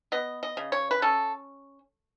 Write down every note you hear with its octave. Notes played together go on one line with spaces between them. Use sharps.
B3 D#5
D#5
C#3
C#5
B4
C#4 A4